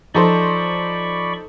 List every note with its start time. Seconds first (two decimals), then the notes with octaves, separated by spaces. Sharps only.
0.14 F3 D#4 A4 C5 D5 B5 C#6